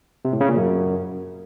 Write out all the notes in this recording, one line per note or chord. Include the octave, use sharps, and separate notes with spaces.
C3
A2
C#3
A#2
F#2